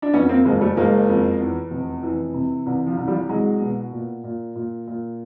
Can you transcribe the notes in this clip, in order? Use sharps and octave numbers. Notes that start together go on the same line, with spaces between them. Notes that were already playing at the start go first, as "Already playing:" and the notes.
D4
F2 B3 C#4
A#3 C4
F#1 G#3 A#3
G3 A3
F#1 G#3 A#3
F2
E2
F1
E3
C3
C2 E3
F3
C2
F3 G3
C2 F#3 G#3
B2
A#2
A#2
A#2
A#2